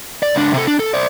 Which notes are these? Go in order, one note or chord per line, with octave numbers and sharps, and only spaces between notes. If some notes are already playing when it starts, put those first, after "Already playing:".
D5
C#2 D4
C3 A4
D4
A4
C5 D5